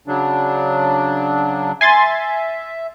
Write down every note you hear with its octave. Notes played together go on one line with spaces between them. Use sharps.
C#3 F#3 D4
E5 G#5 C6 A6